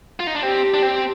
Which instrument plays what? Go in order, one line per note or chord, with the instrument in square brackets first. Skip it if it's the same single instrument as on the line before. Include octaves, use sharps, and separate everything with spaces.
[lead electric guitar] F4
D#4
D4
[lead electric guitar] C4 [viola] G4
[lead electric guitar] D4
C4